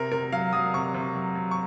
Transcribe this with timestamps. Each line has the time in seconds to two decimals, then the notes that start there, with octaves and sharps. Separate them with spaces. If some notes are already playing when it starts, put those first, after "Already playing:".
Already playing: C3 A#4
0.12 C3 A#4
0.32 F#3 F5
0.53 F#3 D#6
0.74 C3 C#6
0.94 C3
1.15 F#3
1.35 F#3
1.51 C#6